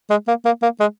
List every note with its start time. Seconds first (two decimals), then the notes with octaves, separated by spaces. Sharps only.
0.10 G#3
0.28 A#3
0.45 A#3
0.62 A#3
0.80 G#3